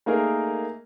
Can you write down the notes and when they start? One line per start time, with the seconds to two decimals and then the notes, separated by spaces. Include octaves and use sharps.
0.06 A3 A#3 D#4 G#4 A#4